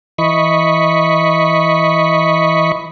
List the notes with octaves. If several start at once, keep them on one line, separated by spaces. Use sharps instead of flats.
E3 D#5 B5 C#6